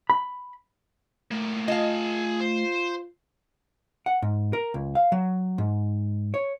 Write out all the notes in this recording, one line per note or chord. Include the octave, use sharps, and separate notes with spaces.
B5
A2 A3 A#3
F4 G#4 D#5 F5 A5
C5
F#5
G#2
A#4
C#2
F5
F#3
G#2
C#5